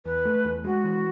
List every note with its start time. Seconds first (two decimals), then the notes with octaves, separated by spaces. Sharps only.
0.05 E2 B4
0.25 A3
0.45 E2
0.64 G#3 F#4
0.84 E3